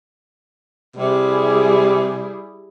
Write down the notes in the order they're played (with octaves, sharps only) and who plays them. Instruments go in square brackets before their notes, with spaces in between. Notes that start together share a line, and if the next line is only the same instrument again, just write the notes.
[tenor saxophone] C3 [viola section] G3 E4 G#4